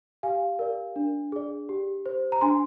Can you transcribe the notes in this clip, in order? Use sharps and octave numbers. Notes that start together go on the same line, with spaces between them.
G4 F5 G#5
A#4 D5
D4
G#4 D5
G4
C5
A#5
D4 G#5 C6